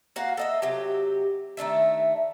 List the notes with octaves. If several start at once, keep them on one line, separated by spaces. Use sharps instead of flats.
A#3 F#4 F5 F#5
A4 D#5 E5
C3 F#3 G4
D#3 A3 D4 E5